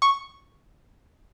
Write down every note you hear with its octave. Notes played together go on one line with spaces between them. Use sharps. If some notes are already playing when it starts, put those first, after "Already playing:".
C#6